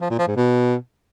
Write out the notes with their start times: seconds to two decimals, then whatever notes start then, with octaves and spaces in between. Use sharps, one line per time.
0.01 F3
0.10 A#2
0.19 F3
0.28 G#2
0.37 B2